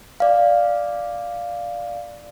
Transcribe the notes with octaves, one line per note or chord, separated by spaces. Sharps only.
D5 F5